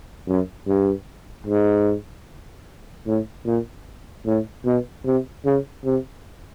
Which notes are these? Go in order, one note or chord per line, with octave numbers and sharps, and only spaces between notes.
F#2
G2
G#2
A2
A#2
A2
B2
C3
C#3
C3